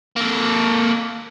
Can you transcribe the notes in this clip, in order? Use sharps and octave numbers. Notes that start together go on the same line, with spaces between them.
A#3 A4